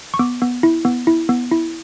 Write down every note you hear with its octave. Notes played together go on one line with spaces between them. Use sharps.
C#6
B3 D6
B3
E4
B3
E4
B3
E4